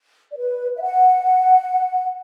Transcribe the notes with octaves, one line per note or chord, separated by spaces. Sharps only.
D5
B4
E5
F#5